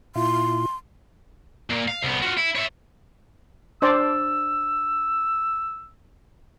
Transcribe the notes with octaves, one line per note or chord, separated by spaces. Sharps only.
A#2 E4 F4 C6
A#2 A#3
F5
C2 B3
F4 F#4
E4
C#5 E5
D4 C5 D5 E6